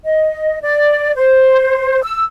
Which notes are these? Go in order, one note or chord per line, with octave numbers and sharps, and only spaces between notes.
D#5
D5
C5
E6